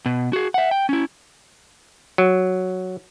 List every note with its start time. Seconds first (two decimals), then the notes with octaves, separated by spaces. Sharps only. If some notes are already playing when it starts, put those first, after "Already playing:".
0.06 B2
0.33 F#4 G#4
0.54 E5 F#5
0.71 G5
0.89 C#4 E4
2.18 F#3